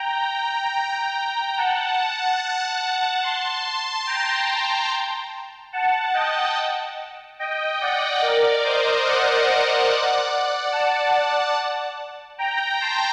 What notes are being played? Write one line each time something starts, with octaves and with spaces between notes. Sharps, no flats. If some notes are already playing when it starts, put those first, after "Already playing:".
Already playing: G5 A#5
F#5 A5
A5 C6
G5 A#5
F#5 A5
D#5 G5
D#5 G5
D5 F#5
A#4 D5
C5 D#5
D5 F#5
D5 F#5
F#5 A5
G5 A#5
A5 C6